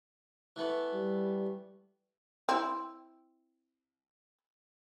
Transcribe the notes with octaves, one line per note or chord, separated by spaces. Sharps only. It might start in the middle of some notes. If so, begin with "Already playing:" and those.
E3 A3 B3
G3
C4 E4